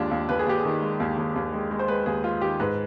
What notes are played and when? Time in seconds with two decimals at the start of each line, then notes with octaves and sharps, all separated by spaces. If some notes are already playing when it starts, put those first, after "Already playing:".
Already playing: D#2 G#3 D4 F4
0.11 D#2
0.29 D#2 B4
0.39 G#4
0.47 D#2 G4
0.60 G#4
0.65 D#3
0.82 G#3
1.00 D#2
1.17 D#2
1.36 D#2
1.53 G#3
1.71 G#3
1.79 C5
1.88 G#3 B4
2.06 D#2 G#4
2.24 G#3 F4
2.41 D#3 G4
2.60 G#2 B4